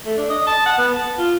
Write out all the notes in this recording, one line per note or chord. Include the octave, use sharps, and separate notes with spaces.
A3
D4
D#5
A5
F#5
B3
A5
F4